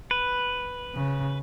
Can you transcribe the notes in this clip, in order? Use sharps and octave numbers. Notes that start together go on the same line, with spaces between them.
B4
C#3